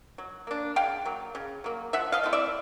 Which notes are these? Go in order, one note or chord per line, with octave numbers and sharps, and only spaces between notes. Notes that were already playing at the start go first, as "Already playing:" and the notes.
F#3
A#3 D4
C#3 F5 G5
F#3 A#3
C#3
F#3 A#3
F3 E5 F#5
D#5 F5
A3 C4 E4
D5 E5